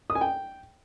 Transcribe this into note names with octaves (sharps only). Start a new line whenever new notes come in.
D#6
G#5
G5